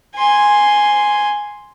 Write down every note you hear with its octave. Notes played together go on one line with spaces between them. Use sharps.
G#5 C6